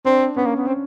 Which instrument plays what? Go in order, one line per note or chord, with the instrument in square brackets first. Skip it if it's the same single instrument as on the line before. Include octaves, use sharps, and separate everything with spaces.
[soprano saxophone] C4 [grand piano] D4
[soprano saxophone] B3 [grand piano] C#4
[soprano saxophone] A#3
B3
C4